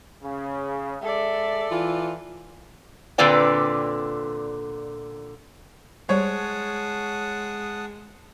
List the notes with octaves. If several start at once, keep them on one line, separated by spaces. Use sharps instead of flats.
C#3
G#3 A4 D5 E5
E3 F4
A#2 D3 C4 B4 D5 G5
G3 G#3 C5 C#5 F#5 A5 D#6 F#6